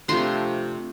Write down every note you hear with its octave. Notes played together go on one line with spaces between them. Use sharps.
C3 F3 A3 D4 A#5 C6